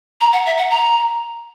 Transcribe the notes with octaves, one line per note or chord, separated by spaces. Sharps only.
A#5
F#5
E5
F#5
A#5